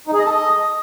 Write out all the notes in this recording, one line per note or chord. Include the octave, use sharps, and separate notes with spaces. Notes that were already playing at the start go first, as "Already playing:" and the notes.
D#4
G#4
D#5
A4
D#5